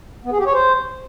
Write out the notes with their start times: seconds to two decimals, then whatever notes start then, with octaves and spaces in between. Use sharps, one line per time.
0.25 B3
0.32 G#4
0.39 G4
0.46 C#5
0.54 C5